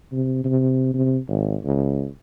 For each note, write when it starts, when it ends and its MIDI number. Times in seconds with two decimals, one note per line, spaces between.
0.12 0.40 48
0.44 0.89 48
0.94 1.17 48
1.28 1.56 32
1.64 2.06 37